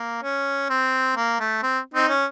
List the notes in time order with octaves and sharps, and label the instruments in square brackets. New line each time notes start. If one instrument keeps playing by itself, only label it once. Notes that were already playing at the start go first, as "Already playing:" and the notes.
Already playing: [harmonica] A#3
C#4
C4
A#3
A3
C4
C4 D#4
C#4